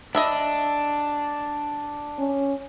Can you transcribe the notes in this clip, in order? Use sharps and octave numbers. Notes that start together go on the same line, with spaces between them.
D4 D#5 E5 B5
C#4